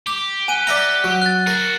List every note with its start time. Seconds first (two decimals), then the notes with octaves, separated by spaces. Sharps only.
0.07 G4 D6
0.48 F#5 G#5 D#7
0.67 D5 E5 A#5 G7
1.04 F#3
1.22 F#6 A6
1.47 F#4 G#4 A#4 C#6